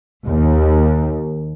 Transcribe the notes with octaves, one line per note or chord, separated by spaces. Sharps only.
D#2